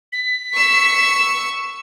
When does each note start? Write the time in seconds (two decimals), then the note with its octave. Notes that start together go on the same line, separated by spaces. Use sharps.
0.13 B6
0.54 C#6 E6